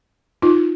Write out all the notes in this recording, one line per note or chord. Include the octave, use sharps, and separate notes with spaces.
D#4 F4